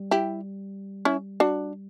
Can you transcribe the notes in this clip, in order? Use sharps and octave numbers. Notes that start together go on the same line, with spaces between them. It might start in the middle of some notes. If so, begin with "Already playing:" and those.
Already playing: G3
E4 G4
C#4 E4
D4 F#4